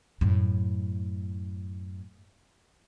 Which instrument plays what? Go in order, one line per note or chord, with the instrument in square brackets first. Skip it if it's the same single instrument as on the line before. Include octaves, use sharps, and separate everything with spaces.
[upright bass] F#2 A2